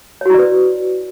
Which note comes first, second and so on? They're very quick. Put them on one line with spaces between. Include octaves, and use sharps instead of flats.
C#5 F#4 E4 D5 B4